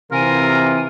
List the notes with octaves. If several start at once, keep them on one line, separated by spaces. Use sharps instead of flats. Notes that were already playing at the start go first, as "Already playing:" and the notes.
C3 E3 F4 A#4 G#5